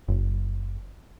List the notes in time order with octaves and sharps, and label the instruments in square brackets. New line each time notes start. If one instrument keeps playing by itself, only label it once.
[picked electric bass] F#1